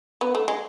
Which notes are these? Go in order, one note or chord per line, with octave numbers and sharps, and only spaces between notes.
B3
A3
G#3